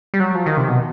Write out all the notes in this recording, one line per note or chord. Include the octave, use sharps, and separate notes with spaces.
G3
F#3
F3
D#3
C3
B2